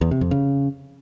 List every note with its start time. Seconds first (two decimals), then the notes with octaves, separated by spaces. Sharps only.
0.01 E2
0.11 C3
0.21 F2
0.31 C#3